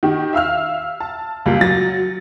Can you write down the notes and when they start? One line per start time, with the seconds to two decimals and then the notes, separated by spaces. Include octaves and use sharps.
0.03 D#3 G4
0.33 E5 F5 E6 F6
1.00 A5
1.46 C#2 G3 A#3 F4
1.61 F#3 A6 A#6